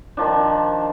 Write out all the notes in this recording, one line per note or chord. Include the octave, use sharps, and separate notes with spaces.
D#3 F3 D4